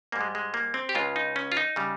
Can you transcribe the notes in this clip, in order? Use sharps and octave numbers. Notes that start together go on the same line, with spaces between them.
G#2 G3 A#3
G#3
G#3
A#3
C4
G4
C#2 C#3 G#3 F4
D#4
C#4
F4
D#4
C#3 G3